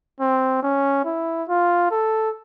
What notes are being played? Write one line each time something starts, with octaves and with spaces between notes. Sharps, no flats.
C4
C#4
E4
F4
A4